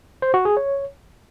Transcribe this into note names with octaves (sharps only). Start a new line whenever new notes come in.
C5
F#4
G#4
C#5